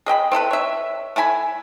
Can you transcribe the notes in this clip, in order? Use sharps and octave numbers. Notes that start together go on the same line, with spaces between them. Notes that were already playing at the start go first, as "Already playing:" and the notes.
G#4 D#5 G5 B5
C4 E4 A4 B4
C#5 E5
A3 E4 G#5 B5